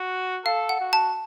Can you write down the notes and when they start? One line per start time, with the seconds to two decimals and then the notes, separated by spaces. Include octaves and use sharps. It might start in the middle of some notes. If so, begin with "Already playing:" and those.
Already playing: F#4
0.45 A4 F5
0.69 F#5
0.81 F#4
0.93 A5